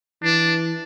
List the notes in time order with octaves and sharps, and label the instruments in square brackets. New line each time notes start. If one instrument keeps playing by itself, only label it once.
[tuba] E3 [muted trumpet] D4